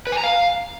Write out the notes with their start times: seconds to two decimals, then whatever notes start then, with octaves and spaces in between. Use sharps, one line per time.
0.07 B4
0.12 G#5
0.18 A#5
0.23 F5